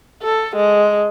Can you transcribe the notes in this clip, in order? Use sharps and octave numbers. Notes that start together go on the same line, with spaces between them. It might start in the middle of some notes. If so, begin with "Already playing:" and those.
A4
G#3